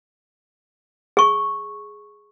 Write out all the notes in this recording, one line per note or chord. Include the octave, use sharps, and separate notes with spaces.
G#4 C#6